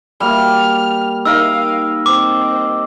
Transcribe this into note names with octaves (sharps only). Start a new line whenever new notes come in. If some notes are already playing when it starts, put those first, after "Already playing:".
G3 A#3 F6
D#4 A#4 D#5 F5 E6
C4 D6